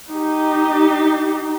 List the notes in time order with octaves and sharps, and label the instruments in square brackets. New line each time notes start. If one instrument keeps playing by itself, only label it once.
[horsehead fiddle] D#4 G4